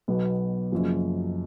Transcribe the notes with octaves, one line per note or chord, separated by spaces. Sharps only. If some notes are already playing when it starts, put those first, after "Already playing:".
B1 B2 F#3 B3
F#1 F#2 F3